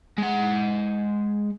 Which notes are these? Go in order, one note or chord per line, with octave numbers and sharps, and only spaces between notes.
G#3 F#5